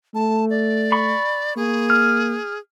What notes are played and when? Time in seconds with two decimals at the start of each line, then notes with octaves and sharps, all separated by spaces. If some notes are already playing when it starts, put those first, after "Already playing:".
0.15 A3 A5
0.50 D5
0.92 B5 C#6
1.56 A#3 G#4
1.90 F6